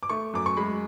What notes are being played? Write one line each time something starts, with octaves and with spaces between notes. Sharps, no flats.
D6
A3 C#6
F#2 D6
C#6
G#3 B5